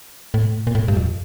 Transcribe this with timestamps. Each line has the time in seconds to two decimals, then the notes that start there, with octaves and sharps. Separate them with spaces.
0.34 A2
0.67 A#2
0.75 A2
0.88 G2
0.97 F2